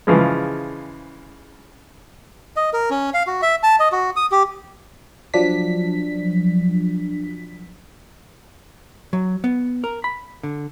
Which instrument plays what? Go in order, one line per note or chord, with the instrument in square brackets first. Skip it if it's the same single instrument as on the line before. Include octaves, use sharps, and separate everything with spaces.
[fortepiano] C#3 E3 F3 G#3
[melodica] D#5
A#4
C#4
F5
F#4
E5
A5
D#5
F#4
D#6
G4
[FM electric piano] F3 F#3 D4 B6
[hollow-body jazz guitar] F#3
B3
A#4
B5
D3